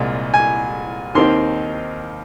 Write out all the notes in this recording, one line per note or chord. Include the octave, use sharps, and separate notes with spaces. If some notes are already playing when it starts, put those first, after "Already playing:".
Already playing: C2 A#2 G#3
G#5
D#2 D#3 C4 D#4 C6